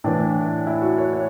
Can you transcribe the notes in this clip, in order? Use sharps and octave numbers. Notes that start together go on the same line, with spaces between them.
A2 E3 D4
E4
F#4
C#5
C#5